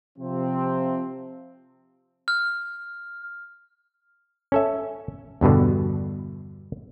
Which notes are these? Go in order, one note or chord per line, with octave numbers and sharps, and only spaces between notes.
C3 F3 C4
F6
C#4 A4 E5
E2 G2 B2 D3